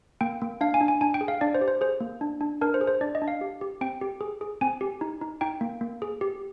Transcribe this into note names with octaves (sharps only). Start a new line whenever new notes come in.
A#3 G5
A#3
D4 F5
G#5
D4
G#5
D4 G#5
G5
G#4
F5
D4 D5
C5
G4
C5
G#4 C5
A#3
D4
D4
D4 A#4
C5
G#4
C5
D4 D5
D#5
D4
F5
G4
G4
C4 G5
G4
G#4
G#4
C4 G#5
G4
D#4
D#4
D#4 G5
A#3
A#3
G#4
G4